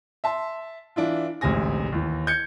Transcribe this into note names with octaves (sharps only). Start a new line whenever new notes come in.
E5 A5 C6
E3 D4 E4 F4
A1 D2 G#2 C3 G#5 A#6
D#2 E3
G6 G#6 C#7